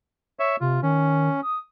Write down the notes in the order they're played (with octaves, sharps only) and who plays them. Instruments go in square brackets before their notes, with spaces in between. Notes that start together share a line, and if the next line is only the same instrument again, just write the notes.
[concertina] C#5 E5
[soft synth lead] C3 [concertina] F4
[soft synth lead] D#3 [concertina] C#4
[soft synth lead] D#6